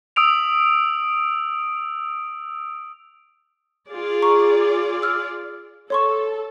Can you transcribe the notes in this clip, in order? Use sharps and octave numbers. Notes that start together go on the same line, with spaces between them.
D#6 E6 D7 F7
F4 G#4 D5
A#5 C#6
E6 F6
A4 C#5 C6 C#6